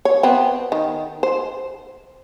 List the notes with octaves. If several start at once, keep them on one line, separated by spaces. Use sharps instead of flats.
C#5
B3 C4
D#3
C5